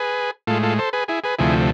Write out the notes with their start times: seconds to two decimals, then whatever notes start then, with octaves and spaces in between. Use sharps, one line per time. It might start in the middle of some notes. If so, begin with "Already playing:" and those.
Already playing: G#4 B4
0.47 A2 G#3 F4 A4
0.63 F4 A4
0.79 A4 C5
0.93 G#4 B4
1.08 E4 G#4
1.24 G#4 B4
1.39 D2 C3 F3 A3 E4 G#4